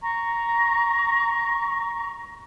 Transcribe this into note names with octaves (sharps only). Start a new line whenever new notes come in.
A#5 C#6